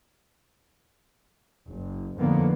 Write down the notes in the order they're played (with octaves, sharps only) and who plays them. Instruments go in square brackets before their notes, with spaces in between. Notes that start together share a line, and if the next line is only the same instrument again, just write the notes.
[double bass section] F#1
F2 A2 D3 A#3 B3